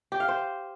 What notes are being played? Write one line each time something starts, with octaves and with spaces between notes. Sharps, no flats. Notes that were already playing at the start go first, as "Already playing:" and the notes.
G4
F5
C5